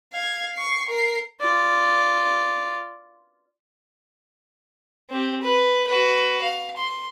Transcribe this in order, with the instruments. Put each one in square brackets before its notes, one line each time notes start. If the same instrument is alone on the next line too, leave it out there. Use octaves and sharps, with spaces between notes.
[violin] F5 G#6
C#6 C7
A#4 C7
[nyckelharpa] F4 D5
[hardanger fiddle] C4 G4
B4
F#4 B4
F5
C6